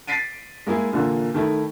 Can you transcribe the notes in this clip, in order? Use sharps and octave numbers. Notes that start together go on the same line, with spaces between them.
A6 B6 C7 D7 D#7
G#3 A#3 E4 G#4
A#2 D3 E3 A#3
D#3 A3 E4